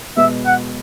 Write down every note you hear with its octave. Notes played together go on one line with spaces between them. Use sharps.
B2 G#3 B3 E5
F#5